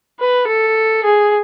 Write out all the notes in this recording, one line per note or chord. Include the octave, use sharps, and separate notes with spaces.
B4
A4
G#4